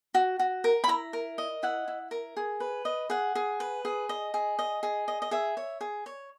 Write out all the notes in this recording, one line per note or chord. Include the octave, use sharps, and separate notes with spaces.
F#4
F#4
A#4
B5
E4 A#5
A#4
D#5
E4 F#5
E4
A#4
G#4
B4
D#5
G#4 F#5
G#4
B4
G#4
D#5
G#4
D#5
G#4
D#5
D#5
G#4 E5
C#5
G#4
C#5